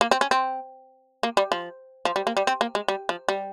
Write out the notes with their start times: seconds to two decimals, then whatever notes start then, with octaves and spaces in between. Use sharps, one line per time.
0.01 A#3
0.11 C4
0.21 C#4
0.31 C4
1.23 A#3
1.37 G3
1.52 F3
2.05 F3
2.16 G3
2.27 A#3
2.37 G3
2.47 C4
2.61 A#3
2.75 G#3
2.88 G3
3.09 F3
3.29 G3